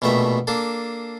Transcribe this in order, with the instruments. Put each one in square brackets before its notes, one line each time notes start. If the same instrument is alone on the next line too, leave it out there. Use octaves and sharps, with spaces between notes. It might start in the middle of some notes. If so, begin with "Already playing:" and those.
[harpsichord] A#1 B2 A3 E5 G5
A#3 D4 A4